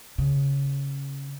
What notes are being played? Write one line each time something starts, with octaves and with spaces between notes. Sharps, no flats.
C#3